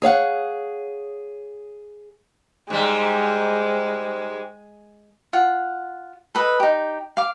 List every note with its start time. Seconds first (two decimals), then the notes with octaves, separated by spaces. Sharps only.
0.02 G#4 C#5 F5 F#5
2.70 G#2 G3 G#3
5.33 F4 F#5
6.35 A4 B4 D#5
6.60 D#4 G4
7.17 F5 D6